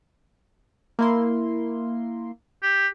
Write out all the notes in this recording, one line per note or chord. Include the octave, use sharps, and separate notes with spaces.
A#3 E4 C6
G4